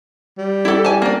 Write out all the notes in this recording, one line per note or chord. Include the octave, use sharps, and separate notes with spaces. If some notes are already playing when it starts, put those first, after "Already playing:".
G3
E4 A4
G#5 A5
A#3 D4